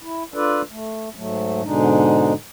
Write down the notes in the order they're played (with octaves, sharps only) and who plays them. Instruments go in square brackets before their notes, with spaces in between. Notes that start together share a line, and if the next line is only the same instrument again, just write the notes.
[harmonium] E4
D4 F4 A4 B4 D5
A3
G#2 F#3 A3
G#2 B2 D3 G#3 D4 D#4